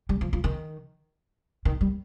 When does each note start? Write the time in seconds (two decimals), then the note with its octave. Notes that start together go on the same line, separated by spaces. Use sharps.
0.09 G3
0.21 F3
0.33 F3
0.44 D#3
1.65 D#3
1.81 G3